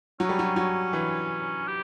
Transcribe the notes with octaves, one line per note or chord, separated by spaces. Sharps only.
F#3 C#4
G3
F#3
F#3
E3
G4